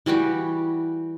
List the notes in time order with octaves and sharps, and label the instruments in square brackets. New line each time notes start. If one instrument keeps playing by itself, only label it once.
[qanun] E3 G3 F#4 G4